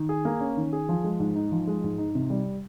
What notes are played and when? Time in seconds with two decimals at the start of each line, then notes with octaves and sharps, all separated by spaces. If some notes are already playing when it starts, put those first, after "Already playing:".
Already playing: D#3
0.09 G#4
0.25 A#3
0.41 C#4
0.57 D#3
0.73 G#4
0.89 F3
1.04 G#3
1.20 G#2
1.36 D#4
1.52 F3
1.67 G#3
1.84 G#2
1.98 D#4
2.15 C3
2.30 G3